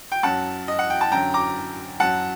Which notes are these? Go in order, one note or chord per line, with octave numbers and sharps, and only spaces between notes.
G5
F#2 F#3 F#5 A5
D#5
F#5
G5
A5
F#2 D3 F#3 G5 A#5
A#5 D6
F#2 F#3 F#5 A5